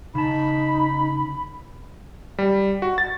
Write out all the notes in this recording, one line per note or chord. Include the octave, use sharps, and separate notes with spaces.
C#3 D#4 A5 B5
G3
F#4
A6